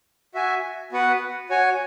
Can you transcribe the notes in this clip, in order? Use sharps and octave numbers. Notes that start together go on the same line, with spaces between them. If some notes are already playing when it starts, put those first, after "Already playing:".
F#4 E5 G#5
B3 F#4 B4 F#5
F#4 C#5 G#5